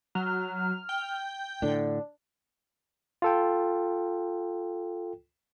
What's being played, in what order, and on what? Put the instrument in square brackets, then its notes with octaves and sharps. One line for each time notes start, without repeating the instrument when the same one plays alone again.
[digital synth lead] F#3 [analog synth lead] F6
[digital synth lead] G5
[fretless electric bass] A2 D3 [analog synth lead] D4
[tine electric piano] F4 A4 G5